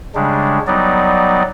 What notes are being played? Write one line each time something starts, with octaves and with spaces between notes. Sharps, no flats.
C#3 G3 G#3 D4
F#3 G3 B3 D#4 D5